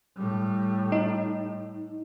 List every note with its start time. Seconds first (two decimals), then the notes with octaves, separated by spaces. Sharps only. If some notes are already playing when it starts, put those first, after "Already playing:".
0.16 A2 G3
0.92 D#4